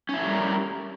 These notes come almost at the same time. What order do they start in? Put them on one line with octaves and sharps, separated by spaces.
C#4 E4 A3 G3 A#4